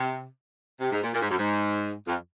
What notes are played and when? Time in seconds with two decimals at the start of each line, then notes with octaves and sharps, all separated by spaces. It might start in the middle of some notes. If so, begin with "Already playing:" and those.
Already playing: C3
0.81 C3
0.92 G#2
1.03 A#2
1.14 A#2
1.22 G#2
1.30 F#2
1.38 G#2
2.07 F2